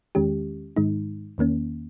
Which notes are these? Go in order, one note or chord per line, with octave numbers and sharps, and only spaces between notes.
E2 D#3 G#3 C#4 G4
G#2 D#3 G#3 D#4
E2 D#3 A#3 C#4